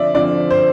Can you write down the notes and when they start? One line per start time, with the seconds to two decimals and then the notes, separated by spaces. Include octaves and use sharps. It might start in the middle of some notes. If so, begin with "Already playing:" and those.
Already playing: D3 F3 C4 D5 E5
0.14 D3 F3 C4 D5
0.50 C5